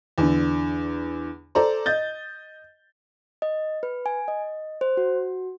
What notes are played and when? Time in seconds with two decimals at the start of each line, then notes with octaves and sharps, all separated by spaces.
0.18 E2 D3
1.55 A4 C5 D5 A#5
1.86 D#5 G6 A6
3.42 D#5
3.83 B4
4.06 G#5
4.28 D#5
4.81 C5
4.97 F#4